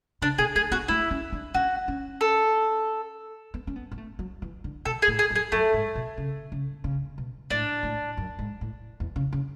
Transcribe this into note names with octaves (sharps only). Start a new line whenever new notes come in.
C#3 D4
B2 G#4
A3 G#4
B3 F#4
A3 E4
C#4
D4
C#4 F#4
C#4
A4
B3
C#4
B3
B3
A3
F#3
E3
D3
B2 A4
G#4
A2
G#4
F#2
G#4
F#2 A3
G#2
B2
C#3
C#3
C#3
B2
A2 D4
A2
F#2
G#2
A2
E2
C#3
C#3